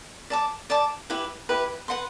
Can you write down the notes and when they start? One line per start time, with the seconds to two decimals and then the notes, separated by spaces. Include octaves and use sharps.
0.30 D5 A5 D6
0.70 D5 A5 D6
1.10 E4 G4 B4
1.49 E4 G4 B4
1.88 B4 F#5 C6